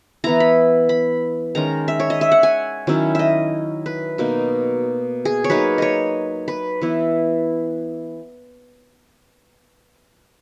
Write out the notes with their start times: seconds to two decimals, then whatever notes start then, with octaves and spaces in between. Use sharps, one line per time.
0.24 E3 B3 E4 A#5
0.40 B5
0.89 B5
1.55 D#3 G#3 C#4 A#5
1.88 E5
2.00 C#5
2.10 D#5
2.21 E5
2.32 F#5
2.43 G#5
2.87 D#3 F#3 C#4 E4
3.15 D#5 E5
3.86 B4
4.18 B2 A#3 D#4
5.25 G#4
5.44 C#5
5.50 F#3 A#3 D#4 B4
5.78 C#5 D#5
6.48 B4
6.82 E3 B3 E4